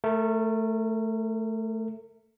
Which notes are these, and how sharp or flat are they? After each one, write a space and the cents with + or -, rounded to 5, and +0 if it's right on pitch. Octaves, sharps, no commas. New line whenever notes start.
A3 +0 A#4 -30